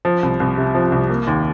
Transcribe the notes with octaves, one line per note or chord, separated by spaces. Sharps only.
F3
C2
C2
C3
F3
C2
A#3
D#2